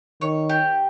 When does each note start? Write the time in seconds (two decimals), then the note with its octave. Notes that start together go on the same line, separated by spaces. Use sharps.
0.21 D#3 C#5
0.49 G4